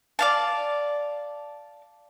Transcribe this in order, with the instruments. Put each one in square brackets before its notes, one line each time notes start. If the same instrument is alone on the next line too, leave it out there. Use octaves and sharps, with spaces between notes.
[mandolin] D5 F5 A5